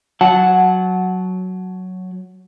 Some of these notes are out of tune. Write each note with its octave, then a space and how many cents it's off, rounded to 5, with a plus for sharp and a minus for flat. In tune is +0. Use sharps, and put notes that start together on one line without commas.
F#3 +0 F#5 +0 A5 -15